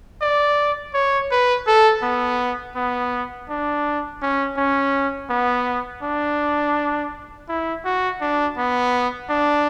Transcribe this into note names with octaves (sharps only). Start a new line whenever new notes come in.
D5
C#5
B4
A4
B3
B3
D4
C#4
C#4
B3
D4
E4
F#4
D4
B3
D4